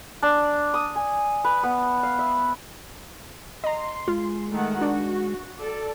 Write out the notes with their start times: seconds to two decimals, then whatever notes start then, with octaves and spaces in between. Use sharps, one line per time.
0.23 D4
0.74 D#6
0.96 G#5
1.45 B4
1.63 B3
2.03 F5
2.19 E5
3.64 D#5 A#5 C6
4.08 G#3 F4
4.52 D#3 A3 F#5
4.81 D4 F#4
5.59 A4 D5